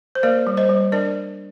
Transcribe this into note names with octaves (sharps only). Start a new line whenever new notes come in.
C5
A#3 A#4 D5
G3
C5 D#5
G3
D4 A#4 D5